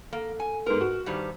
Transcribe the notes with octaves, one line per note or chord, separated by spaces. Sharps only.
A#3 A4
G#5
G#2 B3 A#4
F#4
G2 D#3 G3 C5